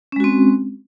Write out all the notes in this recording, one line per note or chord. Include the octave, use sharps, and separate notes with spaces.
G#3 C4 C#4 F#4